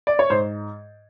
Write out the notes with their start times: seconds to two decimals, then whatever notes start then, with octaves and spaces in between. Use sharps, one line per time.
0.07 D5
0.19 C#5
0.30 G#2 C5